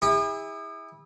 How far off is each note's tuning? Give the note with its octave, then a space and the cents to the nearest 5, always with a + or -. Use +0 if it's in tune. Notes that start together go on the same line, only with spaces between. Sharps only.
E4 -25 G#4 -45